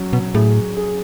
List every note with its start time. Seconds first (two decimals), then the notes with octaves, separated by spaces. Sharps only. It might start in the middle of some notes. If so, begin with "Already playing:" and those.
Already playing: F#3 C#4
0.13 B2
0.34 A2 G#4
0.77 G#4